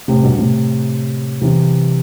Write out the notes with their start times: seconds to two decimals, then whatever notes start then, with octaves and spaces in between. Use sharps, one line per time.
0.08 A2 C3
0.23 G2 B2
0.38 A2 C3
1.42 C3 E3